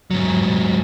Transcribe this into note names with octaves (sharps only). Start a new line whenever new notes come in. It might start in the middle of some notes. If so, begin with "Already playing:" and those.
G#2 F#3